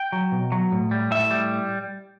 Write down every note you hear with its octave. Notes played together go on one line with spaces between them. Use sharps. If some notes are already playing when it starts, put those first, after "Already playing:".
Already playing: G5
F#3
B2
F#3
A2
G3
A2 E5
G3